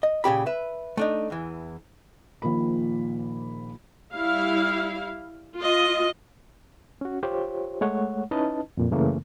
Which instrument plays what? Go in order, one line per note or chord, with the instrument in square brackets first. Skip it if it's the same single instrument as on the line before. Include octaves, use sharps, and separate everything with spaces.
[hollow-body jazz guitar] D#5
A#2 C#3 G4 B5
B4 E5
A3 D4 D#4
E2 E3
[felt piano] A#1 A#2 D#3 F3 A#3 B5
[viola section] G3 E4 F5
F4 D#5
[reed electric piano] C#4 F#4
F4 G4 C5 C#5
G#3 A3 C#5 F#5
C#4 D#4 E4 B4 D#5 A5
F2 A#2
F#2 C#3 E3 A3 A#3